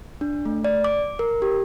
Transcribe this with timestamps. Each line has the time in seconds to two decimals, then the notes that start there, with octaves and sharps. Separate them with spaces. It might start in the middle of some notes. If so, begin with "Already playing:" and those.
0.21 D4
0.46 A3
0.64 D5
0.84 D6
1.19 A#4
1.42 G4